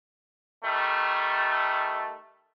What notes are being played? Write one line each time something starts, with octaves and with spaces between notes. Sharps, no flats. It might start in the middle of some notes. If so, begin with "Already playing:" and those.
D#3 G3 A3